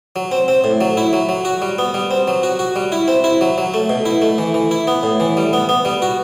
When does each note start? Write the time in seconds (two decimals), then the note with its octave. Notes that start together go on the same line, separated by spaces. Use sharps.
0.16 F#3
0.32 C4
0.48 C4
0.64 A2
0.81 F#3
0.97 E4
1.13 F#3
1.29 F#3
1.45 F#4
1.62 G3
1.78 B3
1.94 G3
2.11 C4
2.28 F#3
2.43 F#4
2.59 F#4
2.76 G3
2.92 E4
3.08 C4
3.24 E4
3.41 F#3
3.58 F#3
3.74 A3
3.89 B2
4.05 E4
4.22 A3
4.38 E3
4.54 E3
4.71 E4
4.87 B3
5.03 A2
5.20 E3
5.37 G3
5.53 B3
5.69 B3
5.85 G3
6.02 F#4